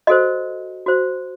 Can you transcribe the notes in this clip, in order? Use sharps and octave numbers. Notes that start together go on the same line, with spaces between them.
F#4 A4 C5 D#5
F#4 C5